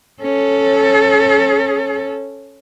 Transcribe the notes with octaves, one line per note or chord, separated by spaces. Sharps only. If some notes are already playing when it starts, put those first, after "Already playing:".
C#4 A4